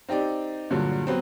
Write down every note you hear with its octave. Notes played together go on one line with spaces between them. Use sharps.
C4 D#4 G4 D5
G2 A#2 D3 F#3
F#3 B3 C4